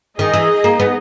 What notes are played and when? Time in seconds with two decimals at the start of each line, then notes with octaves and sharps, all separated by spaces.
0.18 D#3 D#4 G#4 D#5
0.33 E3
0.64 A#3
0.80 B3